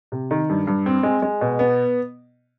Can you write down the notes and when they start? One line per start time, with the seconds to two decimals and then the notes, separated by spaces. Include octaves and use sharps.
0.12 C3
0.31 D#3
0.49 G2
0.67 G2
0.86 C4
1.03 G#3
1.22 G#3
1.41 B2
1.59 B3